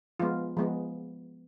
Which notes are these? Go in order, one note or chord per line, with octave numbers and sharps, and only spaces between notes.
F3 G#3 B3 F4
F3 G#3 B3